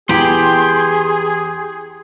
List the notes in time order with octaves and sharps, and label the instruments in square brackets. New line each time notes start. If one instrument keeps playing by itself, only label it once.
[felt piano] E2 [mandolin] G4 G5 B5 [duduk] G#4 [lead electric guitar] C6